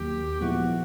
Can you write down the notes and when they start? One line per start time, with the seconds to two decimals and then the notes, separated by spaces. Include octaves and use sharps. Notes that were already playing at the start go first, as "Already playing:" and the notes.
Already playing: D#2 D#3 F#3 A#3 G4
0.41 A#2 F3 G#3 B3 E4 F#4